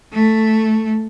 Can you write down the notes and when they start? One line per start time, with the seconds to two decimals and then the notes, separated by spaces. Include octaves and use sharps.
0.13 A3